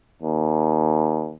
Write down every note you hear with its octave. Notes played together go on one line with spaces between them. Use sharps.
D#2